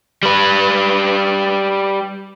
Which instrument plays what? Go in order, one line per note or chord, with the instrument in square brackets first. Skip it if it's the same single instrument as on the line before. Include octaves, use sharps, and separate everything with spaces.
[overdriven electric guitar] G3 B4